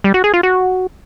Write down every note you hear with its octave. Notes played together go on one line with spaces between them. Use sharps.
G3
F#4
G#4
F4
F#4